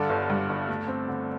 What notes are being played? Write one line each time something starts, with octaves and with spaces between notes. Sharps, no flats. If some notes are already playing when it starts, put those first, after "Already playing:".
Already playing: G2 D3 A4 D5
G1
G2
G1
A3
C4
D3